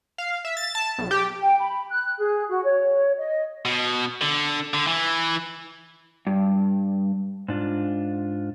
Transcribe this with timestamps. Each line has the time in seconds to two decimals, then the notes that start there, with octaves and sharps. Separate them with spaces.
0.18 F5
0.45 E5
0.57 A6
0.75 A5
0.98 B1
1.11 G4
1.42 G5
1.59 B5
1.90 F#6
2.17 G#4
2.49 F#4
2.64 C#5
3.17 D#5
3.65 B2
4.21 D3
4.74 D3
4.87 E3
6.27 G2
7.48 G#2 D4 F4